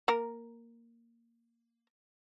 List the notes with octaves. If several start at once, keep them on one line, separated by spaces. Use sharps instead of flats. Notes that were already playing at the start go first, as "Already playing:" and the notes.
A#3 A#4